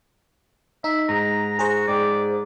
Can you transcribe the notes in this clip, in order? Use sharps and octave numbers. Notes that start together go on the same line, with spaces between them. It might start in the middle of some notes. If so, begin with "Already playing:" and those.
D#4 E5
G#2 A#5
F#4 G#4 C5
G#2 D5 G5